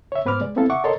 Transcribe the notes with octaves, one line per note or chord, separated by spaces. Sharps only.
C#5 E5
G#2 B3 B4 C5 D6 F6
G#3 D5
B3 C4 E4 A4 F5
E5 F#5 C#6 D6
A4 A#4 C#5 D#5 A5 C6